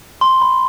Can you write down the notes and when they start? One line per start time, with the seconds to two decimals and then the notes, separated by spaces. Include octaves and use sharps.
0.21 C6
0.42 B5